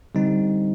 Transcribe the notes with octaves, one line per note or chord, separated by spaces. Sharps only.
D3 G3 C4 D#4